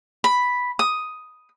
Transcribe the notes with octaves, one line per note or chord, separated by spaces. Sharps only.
B5
D#6